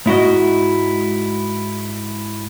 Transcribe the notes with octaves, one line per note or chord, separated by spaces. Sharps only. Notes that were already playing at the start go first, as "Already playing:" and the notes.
G#2 E4 F#4 D#5